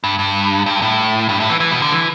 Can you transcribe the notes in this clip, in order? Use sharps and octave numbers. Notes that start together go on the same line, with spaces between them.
G2
G2
G2
A2
G2
A2
E3
E3
B2
D3
E3